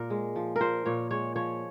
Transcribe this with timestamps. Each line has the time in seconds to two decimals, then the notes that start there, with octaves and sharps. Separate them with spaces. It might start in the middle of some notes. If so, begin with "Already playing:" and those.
Already playing: A#2 A#4
0.10 G#3
0.36 F3
0.56 A#4
0.61 A#2 C5
0.86 A#2 C#5
1.11 G#3 C#5
1.36 F3 C#5